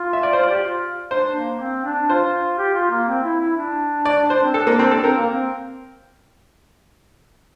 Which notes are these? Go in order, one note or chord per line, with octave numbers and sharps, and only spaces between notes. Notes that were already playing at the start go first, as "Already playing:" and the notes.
Already playing: F4
E5
D5
C5
D5
G4
F4
D4 C5
A#3
C4
D4
F4 C5
G4
F4
A#3
C4
E4
E4
D4
D5
C5
C4
D4 A4
A#3
C4
A4
C4 A#4
A#3
C4